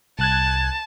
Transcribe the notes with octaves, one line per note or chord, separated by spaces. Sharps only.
C2 A5 F#6 G#6